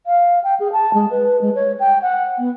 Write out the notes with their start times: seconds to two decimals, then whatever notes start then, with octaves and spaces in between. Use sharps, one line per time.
0.07 F5
0.44 G5
0.60 G#4
0.72 A5
0.94 G#3
1.11 B4
1.41 G#3
1.55 C#5
1.80 G5
2.02 F#5
2.38 B3